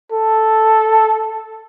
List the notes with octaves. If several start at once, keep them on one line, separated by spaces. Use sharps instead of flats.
A4